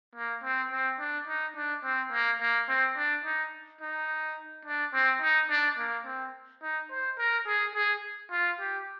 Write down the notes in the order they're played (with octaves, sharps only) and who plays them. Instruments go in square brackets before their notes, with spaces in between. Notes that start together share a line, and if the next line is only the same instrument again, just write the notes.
[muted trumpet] A#3
C4
C4
D4
D#4
D4
C4
A#3
A#3
C4
D4
D#4
D#4
D4
C4
D#4
D4
A#3
C4
D#4
C5
A#4
G#4
G#4
F4
G4